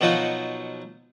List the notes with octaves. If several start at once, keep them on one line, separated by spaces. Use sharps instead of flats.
B2 F3 F#3 D#4 F4 F#4